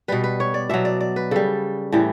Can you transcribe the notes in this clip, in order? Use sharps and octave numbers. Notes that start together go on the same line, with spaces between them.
B2 G3 B4
B4
C#5
D5
B2 F#3 E5
D5
D5
B4
C#3 G3 A4
A2 E3 G3